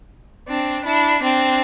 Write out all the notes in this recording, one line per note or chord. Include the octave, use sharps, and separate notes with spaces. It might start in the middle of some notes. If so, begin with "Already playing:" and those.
C4 D4
D4 E4
C4 D4